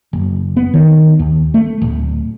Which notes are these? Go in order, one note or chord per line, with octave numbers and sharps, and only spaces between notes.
F#1
B3
D#3
D#2
A3
D1